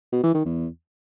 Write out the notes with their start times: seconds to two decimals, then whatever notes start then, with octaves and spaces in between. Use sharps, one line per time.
0.13 B2
0.24 E3
0.34 D#3
0.45 E2